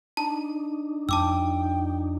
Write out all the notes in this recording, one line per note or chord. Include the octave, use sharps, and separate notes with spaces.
D4 D#4 A5
F2 G5 A5 D6 E6